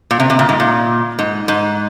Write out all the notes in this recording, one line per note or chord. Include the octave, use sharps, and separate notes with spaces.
A#2
C3
C3
A#2
G#2
A#2
G#2
G#2